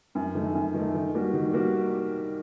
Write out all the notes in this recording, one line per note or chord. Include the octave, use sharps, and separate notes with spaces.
F#2
D#3 A3
F#2
D#3 A3
D#3
G3 A#3 F#4
D#3
G3 A#3 F#4